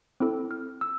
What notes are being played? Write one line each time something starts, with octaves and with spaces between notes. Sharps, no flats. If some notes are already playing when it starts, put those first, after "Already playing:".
C4 E4 A4
F6
E6